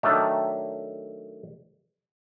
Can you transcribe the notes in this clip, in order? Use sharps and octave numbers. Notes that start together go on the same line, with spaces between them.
D#3 F#3 A3 D4